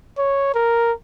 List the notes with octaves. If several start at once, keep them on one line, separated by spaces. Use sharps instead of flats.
C#5
A#4